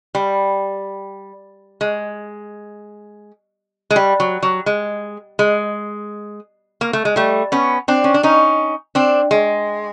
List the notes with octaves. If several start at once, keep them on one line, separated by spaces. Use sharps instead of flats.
G3
G#3
G#3
G3
F#3
F#3
G#3
G#3
A#3
A3
G#3
G3 A3
B3 C#4
C4 D4
C#4
D4
C#4 D#4
C4 D4
G#3